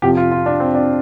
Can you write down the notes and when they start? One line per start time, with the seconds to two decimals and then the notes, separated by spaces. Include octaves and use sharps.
0.02 F2 C3 F3 G4
0.17 F4
0.31 F4
0.46 D4
0.60 C4
0.75 D4